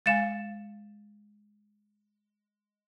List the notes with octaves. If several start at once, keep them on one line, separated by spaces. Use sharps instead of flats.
G#3 F5 G#5 A6 C#7 E7